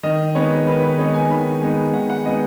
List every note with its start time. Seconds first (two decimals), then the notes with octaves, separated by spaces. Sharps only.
0.03 D#3 D#5
0.35 G#3 B3 D#4 C#5
0.67 D#3 B4
0.83 B4
0.98 G#3 B3 D#4 C#5
1.14 G#5
1.30 D#3 B5
1.62 G#3 B3 D#4
1.93 D#3 F#5
2.10 F#5
2.25 G#3 B3 D#4 D#5